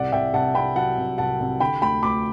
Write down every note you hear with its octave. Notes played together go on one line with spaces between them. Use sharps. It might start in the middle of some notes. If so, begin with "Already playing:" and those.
Already playing: C2 D5 F#5
C2 E5 G5
C2 F#5 A5
C2 G5 B5
F#3 F#5 A5
C2
C2 F#5 A5
C2
D3 G5 B5
D2 G5 B5
D2 B5 D6